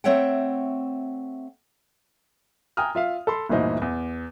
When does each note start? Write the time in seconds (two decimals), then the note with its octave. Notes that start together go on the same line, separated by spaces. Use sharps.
0.04 A3 C4 C#5 E5 F#5 G5
2.77 G5 G#5 A#5 D#6 F6
2.95 F4 E5 F5
3.27 A4 B5 C6
3.49 G1 D2 A#2 E3 D#4 C5
3.82 E2